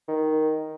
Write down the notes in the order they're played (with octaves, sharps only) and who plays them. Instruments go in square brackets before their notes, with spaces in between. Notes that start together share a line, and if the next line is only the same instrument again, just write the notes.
[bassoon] D#3